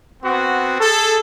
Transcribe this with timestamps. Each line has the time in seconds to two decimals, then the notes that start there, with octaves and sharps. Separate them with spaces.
0.23 B3 C4 F#4
0.79 G#4 A4